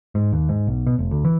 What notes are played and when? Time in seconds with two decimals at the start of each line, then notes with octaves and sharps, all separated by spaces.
0.15 G#2
0.33 D#2
0.49 G#2
0.67 B1
0.87 B2
0.99 F1
1.11 D2
1.25 E3